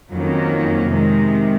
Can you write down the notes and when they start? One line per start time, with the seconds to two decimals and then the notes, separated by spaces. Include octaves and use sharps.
0.11 F2 D#3 F#3 A#3 C#4
0.91 C3 D#3 G#3